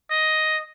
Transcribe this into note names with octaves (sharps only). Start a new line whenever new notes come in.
D#5